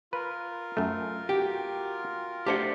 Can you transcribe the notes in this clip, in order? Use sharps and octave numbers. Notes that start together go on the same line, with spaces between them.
F4 A#4 B4
F#2 A3
F#4 G4 G5
A3 D4 G4 C5 F#5